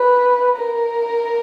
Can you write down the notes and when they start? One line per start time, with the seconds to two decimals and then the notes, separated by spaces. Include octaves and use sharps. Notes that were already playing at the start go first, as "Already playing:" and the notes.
Already playing: B4
0.57 A#4